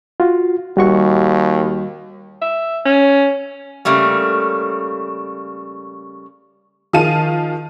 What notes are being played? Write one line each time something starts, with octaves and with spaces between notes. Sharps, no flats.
F4 F#4
D#2 G3 F#4 C#6
E5
C#4
C#3 G3 A3 A#3
D#3 F3 G#4 F5 A5 D#7